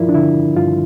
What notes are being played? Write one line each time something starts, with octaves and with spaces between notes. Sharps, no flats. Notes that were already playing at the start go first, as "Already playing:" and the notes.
Already playing: G2 F3 E4 F4 A#4 D5
D4
D3 E4
G2 F4